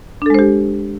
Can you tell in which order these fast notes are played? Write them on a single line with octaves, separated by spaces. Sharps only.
D4 A4 G#3 C5 G4